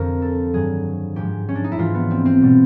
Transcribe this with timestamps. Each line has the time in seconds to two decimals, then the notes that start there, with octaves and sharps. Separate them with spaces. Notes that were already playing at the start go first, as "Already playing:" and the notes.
Already playing: F2 D3 F3 G4 A#4
0.22 A4
0.53 G2 D#3 F#3 G#4
1.16 G#2 F3 G#3 G4
1.49 C#4
1.55 D4
1.64 D#4
1.72 E4
1.78 G#2 E3 G3 F4
1.95 B3
2.11 C4
2.26 C4
2.42 B2 G3